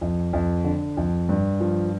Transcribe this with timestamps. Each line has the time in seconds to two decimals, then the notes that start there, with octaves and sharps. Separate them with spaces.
0.01 F2
0.33 F2
0.64 D3
0.97 F2
1.29 G2
1.60 F3